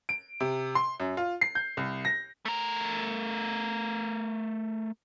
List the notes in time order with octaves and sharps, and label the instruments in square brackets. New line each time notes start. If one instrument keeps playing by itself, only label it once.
[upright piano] D7
C3
C6
F#2
F4
C7
G6
C2
A#6
[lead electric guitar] A3 A#4